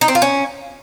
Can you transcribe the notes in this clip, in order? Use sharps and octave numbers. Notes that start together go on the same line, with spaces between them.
D#4
C4
F4
C#4